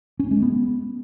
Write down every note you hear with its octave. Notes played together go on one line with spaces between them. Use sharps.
C#4
G#3
B3